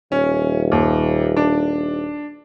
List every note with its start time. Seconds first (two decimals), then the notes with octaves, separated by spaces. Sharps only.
0.12 D#1 C#4
0.72 D#2
1.36 D4